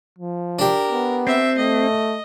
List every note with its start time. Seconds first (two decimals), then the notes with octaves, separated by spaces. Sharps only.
0.18 F3
0.59 D4 G4 A#4
0.90 B3
1.27 C4 E5
1.57 A3 D#5